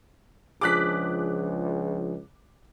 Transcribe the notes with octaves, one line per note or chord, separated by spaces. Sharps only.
C#2 F3 D4 G#4 D6 F#6 B6